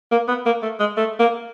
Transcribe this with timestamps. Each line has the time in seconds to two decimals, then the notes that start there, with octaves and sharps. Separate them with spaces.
0.11 A#3
0.28 B3
0.45 A#3
0.63 A3
0.80 G#3
0.97 A3
1.19 A#3